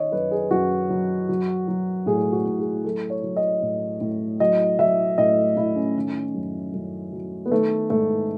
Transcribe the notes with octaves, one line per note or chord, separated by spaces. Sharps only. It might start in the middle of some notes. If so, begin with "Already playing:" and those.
Already playing: D#3 C#5 D#5
F#2 B4
G#4
F#2 F#4
F#3
F#3
F#3
A2 G#4
F#4
A2
G#4
F#3 A4
C#5
F#3
D#5
A2
A2
F#3 D#5
F#3 E5
A2 D#5
A2 E4
C#4
D#3
F#2
F#2
F#3
B3
D#3 A3
G#2 A3